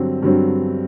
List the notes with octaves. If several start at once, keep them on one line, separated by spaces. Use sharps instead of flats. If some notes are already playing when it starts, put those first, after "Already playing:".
Already playing: G2 D3 F#3 C4
G2 D3 F#3 C4